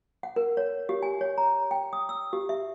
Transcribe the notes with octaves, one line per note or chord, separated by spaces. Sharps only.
F#5
A#4
C#5
G4
G#5
C#5
A#5
G5
D#6
E6
G4
E5